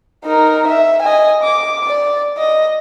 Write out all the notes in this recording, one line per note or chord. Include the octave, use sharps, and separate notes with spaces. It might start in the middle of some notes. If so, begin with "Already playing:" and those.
D#4 A#4
E5
D#5 G#5
D6
D5
D#5